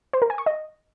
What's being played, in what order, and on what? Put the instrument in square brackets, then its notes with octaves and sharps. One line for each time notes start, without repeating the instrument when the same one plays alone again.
[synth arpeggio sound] C5
A#4
G#5
C#6
D#5